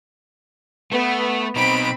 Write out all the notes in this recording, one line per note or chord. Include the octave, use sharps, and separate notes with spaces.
A3 B3
B2 C4 D#4 B5 D7